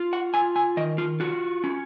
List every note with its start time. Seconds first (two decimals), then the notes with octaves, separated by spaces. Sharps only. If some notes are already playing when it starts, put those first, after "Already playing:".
Already playing: F4
0.13 F#5
0.34 F4 G#5
0.56 G#5
0.77 D#3 D#5
0.98 F4
1.20 F4 F#4
1.64 C#4